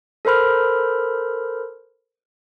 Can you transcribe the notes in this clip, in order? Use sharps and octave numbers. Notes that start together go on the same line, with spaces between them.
A4 A#4 C5 B5 F6